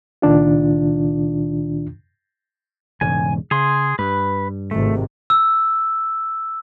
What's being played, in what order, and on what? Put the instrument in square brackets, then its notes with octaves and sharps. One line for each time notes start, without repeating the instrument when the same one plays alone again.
[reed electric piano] C#2 A#2 D#3 D4 F4
[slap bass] E1 G#2 C#3 [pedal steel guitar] G#5
[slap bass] C#3 [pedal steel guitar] G#4 C6
[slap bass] G2 [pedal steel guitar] B4
[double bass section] G#1 C3 [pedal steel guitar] A3
[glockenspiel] E6